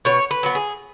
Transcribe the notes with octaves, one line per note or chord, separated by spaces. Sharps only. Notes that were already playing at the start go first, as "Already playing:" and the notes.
B2 C#5
B4
F#3 B3
G#4